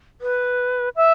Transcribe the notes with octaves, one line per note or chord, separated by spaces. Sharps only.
B4
E5